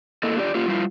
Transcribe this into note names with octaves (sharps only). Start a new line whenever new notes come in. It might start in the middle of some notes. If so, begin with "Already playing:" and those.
A3 A#3 E4 A4 D#5
D4 F4 G4 A4 D5
A#3 F4 G4
G3 E4 F4